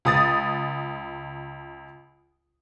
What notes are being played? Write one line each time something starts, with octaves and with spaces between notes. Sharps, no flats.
C#2 D#6 A6